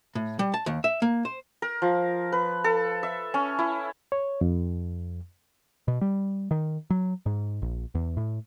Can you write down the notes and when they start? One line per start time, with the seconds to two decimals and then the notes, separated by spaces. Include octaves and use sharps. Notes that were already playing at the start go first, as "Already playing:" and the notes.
0.15 A2
0.39 G3
0.54 A5
0.66 D#2
0.84 E5
1.02 A#3
1.25 C5
1.62 A#4
1.82 F3
2.32 B4
2.64 A4
3.03 E5
3.34 C#4
3.59 E4
4.12 C#5
4.41 F2
5.88 B2
6.01 G3
6.51 D#3
6.90 F#3
7.26 G#2
7.62 A#1
7.95 E2
8.17 A2